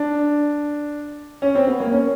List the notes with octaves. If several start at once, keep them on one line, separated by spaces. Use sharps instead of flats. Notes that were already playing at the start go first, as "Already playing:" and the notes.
Already playing: D4
C#4
C4
B3
A#3
C#4